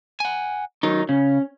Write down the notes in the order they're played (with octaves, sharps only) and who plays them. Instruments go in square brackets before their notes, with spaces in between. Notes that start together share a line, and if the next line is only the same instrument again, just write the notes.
[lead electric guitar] F#5 G#5
[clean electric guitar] D#3 F#3 [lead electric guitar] D#4
[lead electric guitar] C#3 [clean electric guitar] C#4